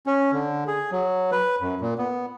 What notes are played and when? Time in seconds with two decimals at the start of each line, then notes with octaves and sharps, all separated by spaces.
0.07 C#4
0.33 D3
0.68 G#4
0.92 F#3
1.32 B4
1.61 F#2
1.81 A#2
1.98 B3